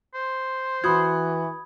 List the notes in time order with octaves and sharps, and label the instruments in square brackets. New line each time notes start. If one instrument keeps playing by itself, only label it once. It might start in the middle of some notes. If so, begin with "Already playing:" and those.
[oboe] C5
[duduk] E3 [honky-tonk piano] F#4 [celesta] B5 D#6 G#6